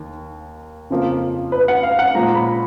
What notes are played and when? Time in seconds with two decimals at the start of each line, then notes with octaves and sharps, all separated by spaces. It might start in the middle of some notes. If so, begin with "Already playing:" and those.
Already playing: D#2 D#3 A#3
0.90 F2 C#3 F3 A#3
1.52 B4
1.68 F#5
1.83 F5
1.99 F#5
2.15 A#2 F3 G#3 A#5
2.35 B5